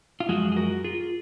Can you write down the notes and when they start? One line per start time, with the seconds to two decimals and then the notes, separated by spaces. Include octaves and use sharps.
0.20 F4
0.29 F#2 F3 G#3 F#4
0.52 G#4
0.57 F#4 A#4
0.84 F4 G#4